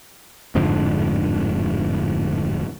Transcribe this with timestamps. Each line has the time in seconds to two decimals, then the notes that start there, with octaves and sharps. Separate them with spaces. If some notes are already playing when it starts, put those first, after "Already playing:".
0.55 D1 F2 G#2 D3